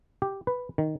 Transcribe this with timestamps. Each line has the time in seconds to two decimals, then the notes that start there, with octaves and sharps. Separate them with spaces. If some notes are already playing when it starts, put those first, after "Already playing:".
0.22 G4
0.47 B4
0.78 D#3